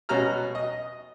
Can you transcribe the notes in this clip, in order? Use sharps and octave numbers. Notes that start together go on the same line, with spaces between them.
B2 C#4 F#4 A#5 F6
D#5